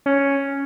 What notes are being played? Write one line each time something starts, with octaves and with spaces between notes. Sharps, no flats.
C#4